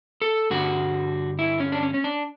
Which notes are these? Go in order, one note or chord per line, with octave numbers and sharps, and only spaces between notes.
A4
G2 D3 G3 F#4
E4
C#4
D4
C#4
C#4
D4